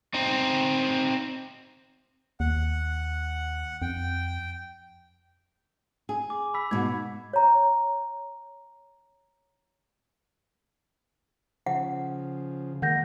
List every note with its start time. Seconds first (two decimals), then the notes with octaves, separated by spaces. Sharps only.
0.14 C4 D#4
2.40 D#2 F#5
3.82 F2 G5
6.09 G#4
6.30 D6
6.54 B5 E6 B6
6.71 G#2 B2 G#6
7.33 C#5 A#5
11.66 C#3 F3 F#5
12.82 D#3 G#3 A#3 F#5 G6 A#6